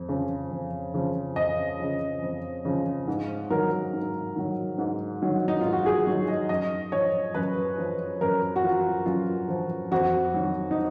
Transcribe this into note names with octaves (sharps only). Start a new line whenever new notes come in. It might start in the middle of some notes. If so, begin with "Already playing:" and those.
Already playing: F2
C#3 F3
F2
C#3 F3
F2 D#5
C#3 F3
F2
C#3 F3
G#2
D#3 F#3 A#4
G#2
D#3 F#3
G#2
D#3 F#3
D#4
G#2 F4
F#4
G#4
D#3 F#3 F#4
D#5
F#2 D#5
F3 C#5
F#2 B4
F3
F#2 A#4
F#4
F3 F4
F#2 F4
F3
F2 F#4
D#3 F#3
D#4